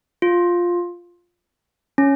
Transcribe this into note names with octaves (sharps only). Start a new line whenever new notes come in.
F4
C#4